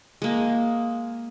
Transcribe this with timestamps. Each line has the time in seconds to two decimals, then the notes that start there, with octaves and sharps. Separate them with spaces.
0.22 G#3 A#3